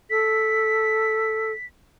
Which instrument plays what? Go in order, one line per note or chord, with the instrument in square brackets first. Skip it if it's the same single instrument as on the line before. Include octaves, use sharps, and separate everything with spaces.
[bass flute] A4 [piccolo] B6